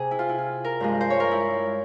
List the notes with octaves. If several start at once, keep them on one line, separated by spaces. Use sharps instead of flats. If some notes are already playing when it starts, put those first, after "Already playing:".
Already playing: C3 G#4
E4
F4
E4
F4
A#4
G2 F3 G#3
C5
C#5
A#4
E4